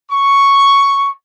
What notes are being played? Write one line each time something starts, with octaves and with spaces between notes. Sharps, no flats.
C#6